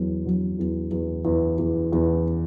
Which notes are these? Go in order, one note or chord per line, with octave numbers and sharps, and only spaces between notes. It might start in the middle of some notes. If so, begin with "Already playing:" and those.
Already playing: E2 F#3
F#3
E2
E2
E2
E2
E2